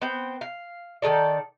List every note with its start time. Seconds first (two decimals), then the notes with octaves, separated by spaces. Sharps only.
0.02 B3 C4 G5
0.41 F5
1.02 D#3 E3 A4 D5